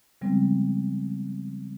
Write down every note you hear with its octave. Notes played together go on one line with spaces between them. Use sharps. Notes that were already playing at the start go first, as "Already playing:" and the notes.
C#3 F3 G3 G#3 B3 C4